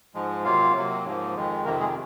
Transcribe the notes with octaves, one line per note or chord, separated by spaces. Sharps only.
G#2 F3 G#3
C3 F#3 A#3 F4 F5
C3 F#3 A#3
G#2 F3 A#3
F2 D#3 G#3
F2 C3 D#3 A#3 A#4
G#3 G#4